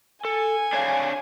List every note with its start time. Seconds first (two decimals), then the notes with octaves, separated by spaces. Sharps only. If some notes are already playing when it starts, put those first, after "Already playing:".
0.25 A4 G#5
0.73 D4 C#5 F5